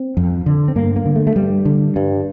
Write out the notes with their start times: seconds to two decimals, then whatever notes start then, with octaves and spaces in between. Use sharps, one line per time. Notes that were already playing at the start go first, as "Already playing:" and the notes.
Already playing: C4
0.17 F2
0.46 D3
0.68 C4
0.76 G2 A#3
0.96 A#3
1.06 D3
1.16 A3
1.27 A3
1.36 G2 G3
1.65 D3
1.96 G2